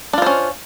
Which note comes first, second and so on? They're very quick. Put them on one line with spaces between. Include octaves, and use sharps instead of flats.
D4 F4 C5 C#4